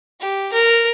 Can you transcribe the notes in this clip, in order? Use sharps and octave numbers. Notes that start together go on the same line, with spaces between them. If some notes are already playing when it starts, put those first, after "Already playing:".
G4
A#4